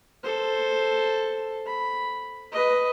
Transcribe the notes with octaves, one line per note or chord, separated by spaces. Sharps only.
A4 C5
B5
B4 D#5